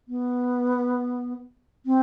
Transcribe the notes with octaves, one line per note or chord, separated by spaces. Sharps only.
B3
C4